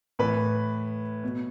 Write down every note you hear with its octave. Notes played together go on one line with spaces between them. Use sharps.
A2 E3 B4
B2